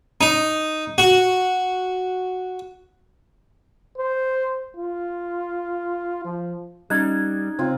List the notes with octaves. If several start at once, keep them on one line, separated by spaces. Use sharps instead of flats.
D#4
F#4
C5
F4
F3
G3 C#4 D#4 F#6 G#6
C#3 C4 F4